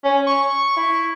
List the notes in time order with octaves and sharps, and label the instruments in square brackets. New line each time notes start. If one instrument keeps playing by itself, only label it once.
[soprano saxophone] C#4
C#6
E4